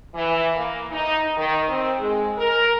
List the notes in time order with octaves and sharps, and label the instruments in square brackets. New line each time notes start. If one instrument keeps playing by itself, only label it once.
[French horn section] E3
A#3
D#4
D#3
C4
G#3
A#4